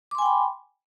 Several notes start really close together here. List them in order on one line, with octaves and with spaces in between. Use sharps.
D6 C6 G#5 G5 B5